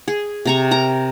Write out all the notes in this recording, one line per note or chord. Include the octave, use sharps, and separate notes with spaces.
G#4
C3 A#5 C#6
A#4 A#5